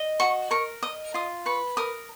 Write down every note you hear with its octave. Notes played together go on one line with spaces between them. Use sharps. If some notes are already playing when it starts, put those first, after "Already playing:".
Already playing: D#5
F#4 C#6
A#4 C#6
D#5 D#6
F4 D#6
B4 C#6
A#4 D#6